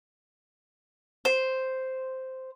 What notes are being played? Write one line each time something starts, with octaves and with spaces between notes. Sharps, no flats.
C5